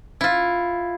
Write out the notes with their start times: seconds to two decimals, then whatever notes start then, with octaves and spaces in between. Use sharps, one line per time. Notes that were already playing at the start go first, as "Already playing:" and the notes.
0.21 E4 F4